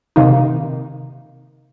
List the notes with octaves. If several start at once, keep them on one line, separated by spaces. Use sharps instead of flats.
C3 D#3 A#3 D#4